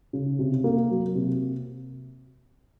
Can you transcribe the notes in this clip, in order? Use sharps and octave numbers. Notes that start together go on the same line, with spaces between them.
C#3
C3
A#3
F#3
C3